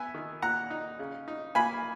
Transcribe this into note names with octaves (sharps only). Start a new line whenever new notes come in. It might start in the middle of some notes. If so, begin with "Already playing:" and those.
Already playing: B3 E5 G#5
D#3
A#2 F#5 A#5
D#4
C#3
D#4
A#3 G#5 B5